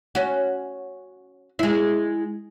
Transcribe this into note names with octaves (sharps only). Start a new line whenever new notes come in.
C#4 F#4
G#3 E4